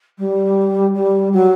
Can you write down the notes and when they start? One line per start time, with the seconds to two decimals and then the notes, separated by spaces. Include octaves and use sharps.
0.18 G3
0.95 G3
1.33 F#3